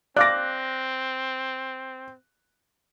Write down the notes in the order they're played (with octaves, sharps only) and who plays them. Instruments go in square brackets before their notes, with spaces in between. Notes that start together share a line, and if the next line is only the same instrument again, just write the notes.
[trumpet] C4 [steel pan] D5 F5 D6 [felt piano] F#6 A#6